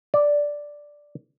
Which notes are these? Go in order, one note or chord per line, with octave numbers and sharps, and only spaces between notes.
D5